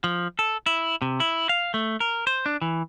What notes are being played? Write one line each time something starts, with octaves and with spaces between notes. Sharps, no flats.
F3
A4
E4
C3
E4
F5
A3
A#4
C5
D4
E3